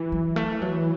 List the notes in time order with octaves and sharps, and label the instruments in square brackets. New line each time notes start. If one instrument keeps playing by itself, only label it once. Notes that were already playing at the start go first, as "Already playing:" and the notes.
Already playing: [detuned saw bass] E3
[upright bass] F#3
A3
F#3